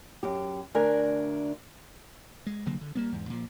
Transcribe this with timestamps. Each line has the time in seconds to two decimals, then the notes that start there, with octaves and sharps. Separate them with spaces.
0.23 F#2 G4
0.74 D2 D4 A#4 G#5
2.46 G#3
2.66 C2 D3 F#3 A#3
2.81 D3
2.95 G3 A#3 B3
3.12 E2 G#2
3.30 A#2 F3